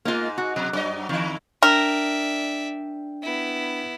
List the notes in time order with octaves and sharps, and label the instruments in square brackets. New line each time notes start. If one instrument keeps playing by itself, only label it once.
[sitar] G#2 D#4 [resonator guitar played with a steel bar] A#3 F4
[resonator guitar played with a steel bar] F#4
[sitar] B2 [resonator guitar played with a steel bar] F#3
[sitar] F#2 F#3 D#5 [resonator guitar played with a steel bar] D5
[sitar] E2 E4 [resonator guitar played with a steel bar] D#3
[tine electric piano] D4 G5 [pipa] A#4 [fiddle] D5 E5
[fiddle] B3 E4